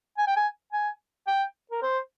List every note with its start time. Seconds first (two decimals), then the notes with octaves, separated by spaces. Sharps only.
0.18 G#5
0.27 G5
0.36 G#5
0.73 G#5
1.27 G5
1.71 A#4
1.82 C5